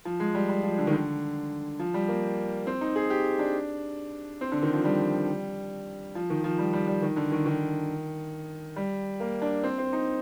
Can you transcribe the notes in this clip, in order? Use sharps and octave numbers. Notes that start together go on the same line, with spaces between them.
F3
G#3
G3
G3
F3
D3
D#3
D3
F3
G3
A#3
C4
D#4
G#4
G4
D4
C4
D3
D#3
F3
G3
F3
D#3
F3
G3
G3
G3
D#3
D3
D#3
D#3
G3
A#3
D4
C4
C4
D#4